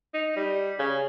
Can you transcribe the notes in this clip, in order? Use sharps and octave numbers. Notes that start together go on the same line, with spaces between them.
D#4
G3
C#3